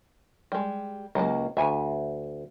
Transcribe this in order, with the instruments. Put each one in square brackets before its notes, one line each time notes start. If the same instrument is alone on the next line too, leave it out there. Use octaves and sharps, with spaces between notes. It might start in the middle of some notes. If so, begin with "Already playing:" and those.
[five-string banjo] G3 G#3
[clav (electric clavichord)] C#2 [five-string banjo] F#3 A#3
[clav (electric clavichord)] D2 [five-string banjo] E5 G#5